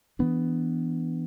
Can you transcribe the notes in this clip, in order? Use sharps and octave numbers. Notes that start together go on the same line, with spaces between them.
E3 B3 D4